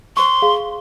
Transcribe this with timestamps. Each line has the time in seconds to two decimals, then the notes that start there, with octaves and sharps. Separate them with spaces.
0.17 C5 C6 C#6
0.42 G#4 F5